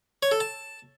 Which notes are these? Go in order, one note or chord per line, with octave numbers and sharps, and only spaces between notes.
C#5
A4
A5